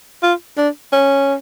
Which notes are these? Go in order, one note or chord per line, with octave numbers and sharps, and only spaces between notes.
F4
D4
C#4